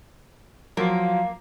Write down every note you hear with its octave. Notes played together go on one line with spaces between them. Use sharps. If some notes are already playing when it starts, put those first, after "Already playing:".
F3 F#3 A#3 F4